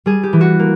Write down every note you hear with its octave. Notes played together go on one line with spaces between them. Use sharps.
G3 G#4
G4
E3
F#4
A#3